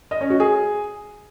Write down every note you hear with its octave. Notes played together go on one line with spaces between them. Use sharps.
D#5
C#4
F#4
G#4